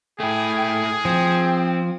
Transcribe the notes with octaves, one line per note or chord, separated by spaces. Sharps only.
A3 E4 G#4 G5
F3 C4 G5